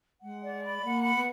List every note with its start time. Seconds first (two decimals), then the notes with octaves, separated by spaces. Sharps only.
0.22 G#3 F#5
0.43 D5
0.64 B5
0.84 A#3 F#5
1.04 B5
1.15 B3